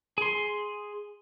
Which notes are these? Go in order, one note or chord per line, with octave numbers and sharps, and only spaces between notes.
G#4 C6